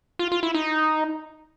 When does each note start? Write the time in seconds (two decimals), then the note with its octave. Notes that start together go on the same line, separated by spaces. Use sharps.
0.19 F4
0.32 F4
0.43 E4
0.55 D#4